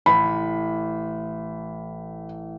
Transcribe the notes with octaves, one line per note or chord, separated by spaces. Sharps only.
A1 B5